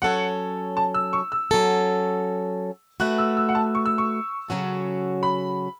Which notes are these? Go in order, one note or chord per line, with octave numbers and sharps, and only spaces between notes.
F#3 C#4 A4 C#5 F#5
A5
E6
C#6
E6
F#3 C#4 A4
A3 F#4 B4 F#6
E6
E6
F#5
A5
C#6
E6
C#6
C#3 F#3 C#4 F#4 A4
B5